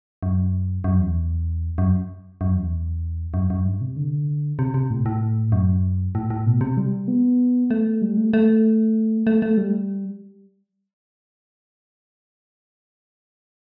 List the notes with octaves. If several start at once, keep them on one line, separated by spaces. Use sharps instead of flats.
F#2
F#2
E2
F#2
F#2
E2
F#2
F#2
G2
C3
D3
C3
C3
A2
A2
F#2
A2
A2
B2
C3
G3
B3
A3
G3
A3
A3
A3
A3
G3